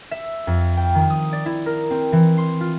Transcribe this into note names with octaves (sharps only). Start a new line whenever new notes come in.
E5
F2
G5
D#3
D#6
D5
E4
A#4
C4
E3
C6
F4